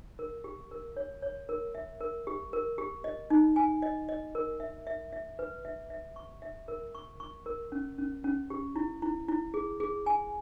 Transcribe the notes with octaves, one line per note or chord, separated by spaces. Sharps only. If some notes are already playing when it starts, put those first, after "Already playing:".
A#4
G4
A#4
C#5
C#5
A#4
E5
A#4
G4
A#4
G4
D#5
D#4
G#5
D#5
D#5
A#4
E5
E5
E5
B4
E5
E5
C#6
E5
A#4
C#6
C#6
A#4
C#4
C#4
C#4
G4
E4
E4
E4
G#4
G#4
G#5